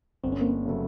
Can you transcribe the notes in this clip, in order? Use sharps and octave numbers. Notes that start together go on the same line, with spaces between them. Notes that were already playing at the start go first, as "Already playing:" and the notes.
G1 C4
C#4
A#3 C4
C#3 F#3 A3